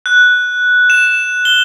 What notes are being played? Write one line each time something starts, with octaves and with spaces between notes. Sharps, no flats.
F#6
E7
G7